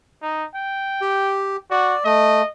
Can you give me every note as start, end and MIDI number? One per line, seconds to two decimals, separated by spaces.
0.22 0.44 63
0.55 1.41 79
1.01 1.56 67
1.71 1.95 66
1.71 2.04 74
2.05 2.42 57
2.05 2.49 75